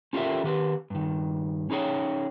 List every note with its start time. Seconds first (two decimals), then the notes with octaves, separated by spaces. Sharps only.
0.13 C#4 F4 G4 A4 A#4 E5
0.44 D#3 G4 B4
0.90 G2 D#3
1.70 C#4 D#4 G#4 C#5 G5